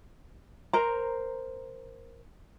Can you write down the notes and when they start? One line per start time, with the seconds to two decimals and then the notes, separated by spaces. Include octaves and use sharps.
0.73 A#4 C5 A#5